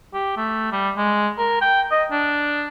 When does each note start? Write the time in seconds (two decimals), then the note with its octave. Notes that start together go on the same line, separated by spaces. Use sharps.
0.14 G4
0.37 A3
0.72 G3
0.97 G#3
1.38 A#4
1.61 G5
1.91 D#5
2.11 D4